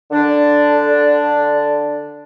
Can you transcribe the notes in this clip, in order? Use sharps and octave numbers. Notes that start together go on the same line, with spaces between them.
D3 D4